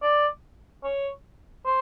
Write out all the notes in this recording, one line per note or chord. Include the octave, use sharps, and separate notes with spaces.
D5
C#5
C5